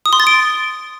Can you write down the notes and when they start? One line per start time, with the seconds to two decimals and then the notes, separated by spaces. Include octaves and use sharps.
0.06 D#6
0.13 C6
0.20 A6
0.27 D7